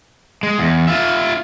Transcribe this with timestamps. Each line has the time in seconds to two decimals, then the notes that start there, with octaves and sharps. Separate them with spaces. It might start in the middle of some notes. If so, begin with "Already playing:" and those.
0.43 G#3
0.58 E2
0.88 F4 E5